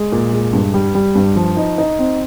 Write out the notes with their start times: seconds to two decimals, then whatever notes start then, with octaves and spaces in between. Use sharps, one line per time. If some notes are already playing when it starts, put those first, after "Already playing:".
Already playing: G#3
0.12 A#2
0.33 G#3
0.53 G2
0.74 G3
0.95 G3
1.15 G2
1.36 F3
1.57 D#4
1.78 D#4
1.99 C4